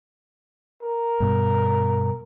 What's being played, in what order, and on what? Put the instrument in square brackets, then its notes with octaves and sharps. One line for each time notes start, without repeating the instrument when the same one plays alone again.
[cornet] A#4
[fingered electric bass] G2 B2